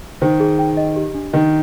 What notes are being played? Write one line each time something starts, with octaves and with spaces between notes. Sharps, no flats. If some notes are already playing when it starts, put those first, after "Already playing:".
D#3 C5
G#4
G5
D#5
G4
D4
D#3 D#5